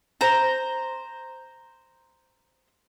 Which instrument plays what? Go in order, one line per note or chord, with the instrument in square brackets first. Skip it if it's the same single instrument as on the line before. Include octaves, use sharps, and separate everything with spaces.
[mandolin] C5 A#5